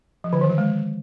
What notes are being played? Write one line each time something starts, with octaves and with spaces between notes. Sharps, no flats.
F3
D3
D#3
F#3
G#3